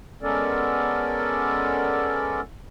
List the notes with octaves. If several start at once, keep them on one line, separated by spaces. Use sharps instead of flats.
G#3 B3 C#4 A4 A#4 D5